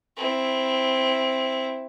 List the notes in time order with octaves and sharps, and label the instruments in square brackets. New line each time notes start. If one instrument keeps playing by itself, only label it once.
[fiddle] C4 E4